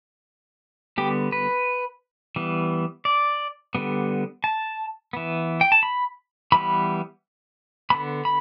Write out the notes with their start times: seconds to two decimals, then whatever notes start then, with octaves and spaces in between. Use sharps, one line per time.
0.98 D3 G3 B3 G4
1.32 B4
2.36 E3 G3 B3
3.05 D5
3.75 D3 G3 B3
4.44 A5
5.13 E3 B3
5.61 G5
5.72 A5
5.83 B5
6.52 E3 G3 B3 B5
7.90 D3 B3 B5
8.25 B5